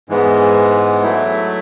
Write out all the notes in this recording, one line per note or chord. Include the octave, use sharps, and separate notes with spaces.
G#2 E3 G#3 B3
F#3 A3 E4